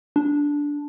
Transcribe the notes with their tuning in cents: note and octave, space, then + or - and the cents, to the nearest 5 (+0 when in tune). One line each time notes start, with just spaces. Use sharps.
D4 -10